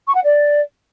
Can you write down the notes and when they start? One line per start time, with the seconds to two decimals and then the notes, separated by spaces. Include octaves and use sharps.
0.06 C#6
0.14 F#5
0.23 D5